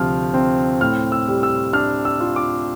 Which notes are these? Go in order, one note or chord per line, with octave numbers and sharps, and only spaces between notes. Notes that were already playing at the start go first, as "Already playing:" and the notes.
Already playing: D2 C3 F3 F6
C4
A2 F6
E6
G3
E6
D4 F6
E6
F4
D6